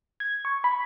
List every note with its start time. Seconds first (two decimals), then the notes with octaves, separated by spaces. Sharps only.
0.20 G#6
0.45 C#6
0.64 B5